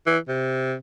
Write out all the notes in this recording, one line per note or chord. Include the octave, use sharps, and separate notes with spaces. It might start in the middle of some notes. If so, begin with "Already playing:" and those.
E3
C3